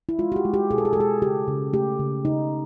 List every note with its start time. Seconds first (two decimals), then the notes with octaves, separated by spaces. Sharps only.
0.09 E4
0.19 G#3 F4
0.32 F#4
0.36 G4
0.45 G#3
0.54 G4
0.71 B2 G#4
0.78 A4
0.85 G#4
0.93 A4
0.96 G#3 G#4
1.22 C#3 G4
1.48 C#3
1.73 A3 G4
1.99 C#3
2.25 C#3 D#4